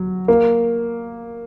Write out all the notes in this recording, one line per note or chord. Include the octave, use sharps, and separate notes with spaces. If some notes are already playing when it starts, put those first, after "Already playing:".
Already playing: F#3
A#3